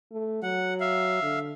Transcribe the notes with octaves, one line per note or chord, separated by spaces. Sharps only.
A3
F#3 F#5
E5 F5
D3